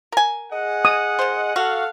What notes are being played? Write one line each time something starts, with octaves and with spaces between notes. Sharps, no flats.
A#4 G#5
G#4 D#5 F#5
D#6
D#3 C5
F#4 A4 F5 F#5